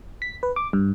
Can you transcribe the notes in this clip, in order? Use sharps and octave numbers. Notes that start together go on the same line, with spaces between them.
B6
B4
D6
G2